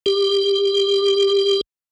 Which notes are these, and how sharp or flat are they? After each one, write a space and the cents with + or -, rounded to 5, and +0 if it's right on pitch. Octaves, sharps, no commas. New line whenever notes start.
G4 +20